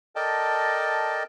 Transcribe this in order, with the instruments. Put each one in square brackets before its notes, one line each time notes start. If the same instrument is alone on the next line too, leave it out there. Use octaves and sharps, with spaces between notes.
[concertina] A4 A#4 D5 D#5 G5 A5